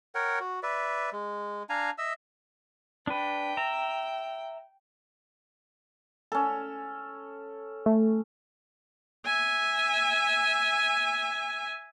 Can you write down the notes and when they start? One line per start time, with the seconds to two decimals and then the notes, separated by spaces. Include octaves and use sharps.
0.15 A#4 C#5 F#5 G5
0.40 F#4
0.63 B4 D5 E5
1.12 G#3
1.69 D4 F5 G#5 A#5
1.98 D#5 E5 E6
3.07 D4 B4 G5
3.57 E5 A#5
6.32 C#4 A4
7.86 A3
9.26 E5 G#5